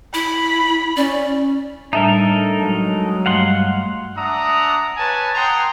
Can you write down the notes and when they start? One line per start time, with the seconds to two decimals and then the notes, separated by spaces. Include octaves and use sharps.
0.14 E4 B5
0.97 C#4 D5
1.93 A2 G3 D4 D#4 A4 A#4 E5
2.60 F#3 G#3 A5
3.26 G2 G3 A3 F5 F#5 C6
4.15 D4 E5 F#5 A#5 D#6
4.97 B4 C#5 G#5 A5
5.35 F#5 G5 A#5 C6 D#6